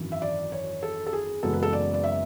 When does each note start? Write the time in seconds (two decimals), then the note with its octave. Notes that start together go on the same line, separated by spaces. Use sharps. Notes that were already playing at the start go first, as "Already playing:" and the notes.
Already playing: G#1 F#2 E3
0.12 E5
0.22 D5
0.52 C#5
0.83 A4
1.07 A4
1.13 G#4
1.43 F#1 F#2 E3 G#3 B3 A4
1.53 B4
1.63 A4
1.73 D5
1.94 D5
2.04 E5